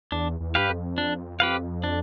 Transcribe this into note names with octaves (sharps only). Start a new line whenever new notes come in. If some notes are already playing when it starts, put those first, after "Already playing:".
E2 D4
E2
G2 G4 B4 F5
F2
D4
G4 B4 F5
D4